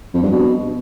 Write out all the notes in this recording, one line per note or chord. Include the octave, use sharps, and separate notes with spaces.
F2
G2
B2